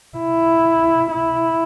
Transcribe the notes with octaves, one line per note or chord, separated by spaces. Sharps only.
E4
E4